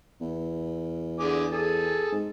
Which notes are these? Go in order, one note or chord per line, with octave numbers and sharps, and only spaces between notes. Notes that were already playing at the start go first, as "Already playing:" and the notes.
E2
D3 G#4 D6
G#4 A4
G#2